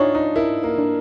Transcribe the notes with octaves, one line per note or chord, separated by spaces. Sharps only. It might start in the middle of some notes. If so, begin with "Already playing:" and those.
Already playing: D4 D#4 F4 C#5
D#4
E4 A#4
A#3
D4